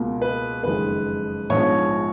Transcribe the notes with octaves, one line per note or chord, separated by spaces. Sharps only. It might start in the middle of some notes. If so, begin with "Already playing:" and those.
Already playing: C#2 B2 A#3 F4
B4
F#1 F2 D#3 G#3 B4
A#1 G#2 F3 B3 C#5